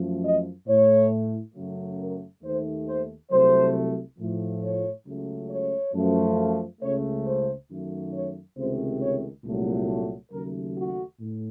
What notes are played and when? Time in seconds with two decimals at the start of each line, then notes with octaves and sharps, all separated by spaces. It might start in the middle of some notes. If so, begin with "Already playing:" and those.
Already playing: F#2 F3 A3
0.24 D#5
0.68 A2 A3 C#5
1.55 F#2 C#3 F#3 A3
1.99 A#4
2.43 D#2 D#3 A3 C5
2.87 C5
3.31 C2 C3 F#3 A3 C5
4.19 A2 F3 A3
4.63 C#5
5.06 C#2 C#3 F#3 A3
5.50 C#5
5.94 F#2 F3 A3
6.82 C#2 C#3 A3 C#5
7.25 C5
7.70 F#2 D#3 F#3 A3
8.13 C#5
8.56 C#2 C3 D#3 A3 C5
9.01 C#5
9.44 C2 A#2 F#3 A3
10.32 D#2 C#3 F#3 A3 A#4
10.76 F#4
11.20 A2